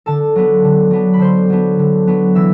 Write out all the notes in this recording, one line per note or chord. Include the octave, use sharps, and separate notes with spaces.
D3 A4 A5
F#3 B3 D4
D3
F#3 B3 D4
B5
D3 C5 C6
F#3 B3 D4
D3
F#3 B3 D4
E3 E5 E6